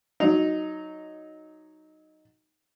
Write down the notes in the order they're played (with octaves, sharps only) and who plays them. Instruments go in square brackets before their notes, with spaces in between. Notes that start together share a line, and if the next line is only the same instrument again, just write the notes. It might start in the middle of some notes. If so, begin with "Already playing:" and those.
[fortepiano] F#3 D#4